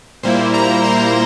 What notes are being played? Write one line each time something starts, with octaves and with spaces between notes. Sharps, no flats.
A#2 G3 A#3 E4 C5
A#5
C6